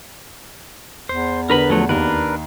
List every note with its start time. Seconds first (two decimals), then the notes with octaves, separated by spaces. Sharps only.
1.09 E2 C5
1.50 D3 B3 A#4 B4 B5
1.70 F3 F#3 A3
1.89 D#2 D4 A#4 B4